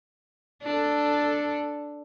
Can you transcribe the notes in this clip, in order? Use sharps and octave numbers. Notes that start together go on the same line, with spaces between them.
D4 A4